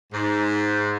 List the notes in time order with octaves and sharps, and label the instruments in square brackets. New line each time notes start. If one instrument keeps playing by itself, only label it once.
[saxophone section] G#2